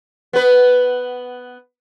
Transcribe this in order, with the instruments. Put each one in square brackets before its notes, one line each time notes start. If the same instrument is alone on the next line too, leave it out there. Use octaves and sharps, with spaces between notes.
[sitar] B3 B4